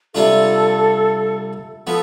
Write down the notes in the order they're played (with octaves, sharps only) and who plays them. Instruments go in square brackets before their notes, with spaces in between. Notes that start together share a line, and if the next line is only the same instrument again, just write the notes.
[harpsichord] C3 G3 D4 F4 [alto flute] A4
[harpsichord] F3 B3 [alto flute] A4